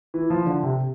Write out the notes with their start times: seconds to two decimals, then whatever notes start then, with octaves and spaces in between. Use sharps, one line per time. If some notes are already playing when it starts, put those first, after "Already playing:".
0.14 E3
0.30 F3
0.46 D3
0.63 C3